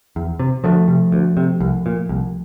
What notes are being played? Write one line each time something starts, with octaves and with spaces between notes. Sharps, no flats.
E2
C3
D2 F3 A3
C3
D2
C3
C2
A#2
C2